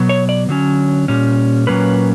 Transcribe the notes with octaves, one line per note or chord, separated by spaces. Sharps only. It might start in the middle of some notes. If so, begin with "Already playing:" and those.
Already playing: B2 F#3 B3
C#5
D5
D3 F#3 C#4
A#2 G3 C#4
A#2 F#3 A#3 C#4 B4